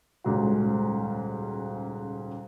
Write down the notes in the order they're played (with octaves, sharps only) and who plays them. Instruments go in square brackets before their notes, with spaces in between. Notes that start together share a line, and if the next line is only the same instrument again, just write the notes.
[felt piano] D#1 C#2 G#2 F#4